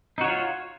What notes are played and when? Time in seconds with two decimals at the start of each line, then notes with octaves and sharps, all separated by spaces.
0.18 D#4
0.21 F#4
0.24 C#5
0.27 F4